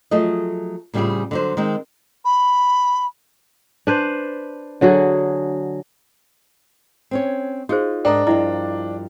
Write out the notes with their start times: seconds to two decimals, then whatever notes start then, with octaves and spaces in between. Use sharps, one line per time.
0.11 F3 F#3 A3 G#4 D#5
0.94 A2 C#3 G3 C4 F4 G#4
1.31 D3 F#3 C5
1.57 D#3 G#3 C4
2.25 B5
3.87 D4 B4 C5
4.81 D3 F#3 F#4 G#4
7.11 C4 C#4 C#5
7.69 D#4 F4 F#4 G#4 C5
8.05 G#2 D4 A#4 D#5 G5 A#5
8.27 G2 F3 E4 A#4 D5 D#5